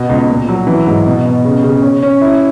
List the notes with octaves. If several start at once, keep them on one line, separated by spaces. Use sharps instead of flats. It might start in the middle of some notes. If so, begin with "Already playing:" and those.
Already playing: B2
C#2
A#2
F#3
E3
G#2
B2
B2
C#3
C#3
C#4
C#4
E4